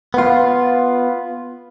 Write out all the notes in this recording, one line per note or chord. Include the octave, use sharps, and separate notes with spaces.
B3 F4